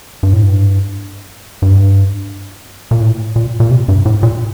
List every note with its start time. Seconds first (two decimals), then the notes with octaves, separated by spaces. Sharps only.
0.23 G2
0.33 A2
0.43 G2
1.62 G2
2.91 A#2
3.01 A2
3.36 A#2
3.60 A#2
3.71 C3
3.88 G2
4.05 A2
4.23 A#2